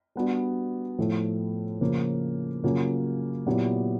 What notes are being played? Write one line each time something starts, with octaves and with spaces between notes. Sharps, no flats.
G3 B3 D4 F#4
A2 F3 A3
C#3 F3 A#3
C#3 F#3 A#3 C#4 F4
A#2 F#3 B3 E4 G4